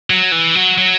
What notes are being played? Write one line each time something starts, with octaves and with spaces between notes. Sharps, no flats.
F#3
E3
F#3
F#3